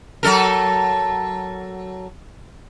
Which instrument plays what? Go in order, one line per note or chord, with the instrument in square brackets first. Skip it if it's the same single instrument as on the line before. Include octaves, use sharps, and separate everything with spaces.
[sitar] F#3 A4 A#4